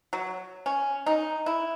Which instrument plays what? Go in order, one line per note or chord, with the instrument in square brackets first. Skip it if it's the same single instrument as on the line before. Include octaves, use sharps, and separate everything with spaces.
[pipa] F#3
C#4
D#4
E4